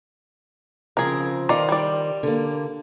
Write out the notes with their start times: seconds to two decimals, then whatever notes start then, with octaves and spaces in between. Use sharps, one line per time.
0.97 C#3 F3 C4 G#4 A#4
1.49 D#3 D#4 F4 C5 D5
1.69 G3 D5
2.23 D3 A#3